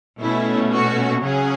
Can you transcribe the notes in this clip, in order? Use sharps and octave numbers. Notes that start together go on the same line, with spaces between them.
B2 A3 C#4 E4
F#4
C#3 F#3 C#4 G#4